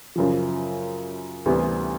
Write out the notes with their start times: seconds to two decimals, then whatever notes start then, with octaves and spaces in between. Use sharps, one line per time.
0.16 F#2 C#3 F3
1.46 D2 C3 E3 G3 B3